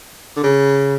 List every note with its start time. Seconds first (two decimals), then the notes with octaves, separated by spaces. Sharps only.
0.36 D3
0.43 C#3